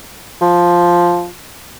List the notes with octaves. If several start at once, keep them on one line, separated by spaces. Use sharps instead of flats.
F3